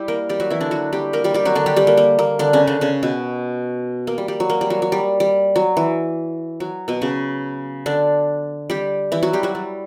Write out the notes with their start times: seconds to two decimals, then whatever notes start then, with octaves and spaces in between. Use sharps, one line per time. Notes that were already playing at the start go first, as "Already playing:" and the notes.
Already playing: G3 E4 G4
0.08 A#3 A#4
0.29 G3 G4
0.40 F#3 F#4
0.50 E3 E4
0.61 D3 D4
0.71 F#3 F#4
0.93 G3 G4
1.13 A#3 A#4
1.24 G3 G4
1.34 G3 G4
1.45 F#3 F#4
1.55 D3 D4
1.66 G3 G4
1.76 G3 G4
1.87 A#3
1.97 A#3
2.19 A#3
2.39 D3 D4
2.53 C#3 C#4
2.67 D3 D4
2.81 C#3 C#4
3.03 B2 B3
4.07 A#3
4.18 G3
4.28 G3
4.40 F#3
4.50 A#3
4.61 G3
4.70 F#3
4.82 F#3
4.92 G3
5.20 G3
5.56 F#3
5.77 E3
6.60 F#3
6.88 B2 B3
7.02 C#3 C#4
7.86 D3 D4
8.70 G3 G4
9.12 E3 E4
9.23 F#3 F#4
9.33 G3 G4
9.43 F#3 F#4
9.55 G3